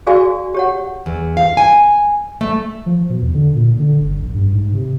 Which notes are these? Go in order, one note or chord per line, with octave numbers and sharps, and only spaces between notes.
F#4 G#4 D5 F5 G#5
G4 C#5 F#5
E2
F5
G#5
A3
F3
B2
E2
D3
A#2
D3
G1
A#1
G2
G#2
C3